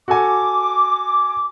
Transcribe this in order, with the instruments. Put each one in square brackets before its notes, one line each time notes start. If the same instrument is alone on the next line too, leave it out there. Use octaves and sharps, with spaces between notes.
[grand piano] F#4 A4 G#5 [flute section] D6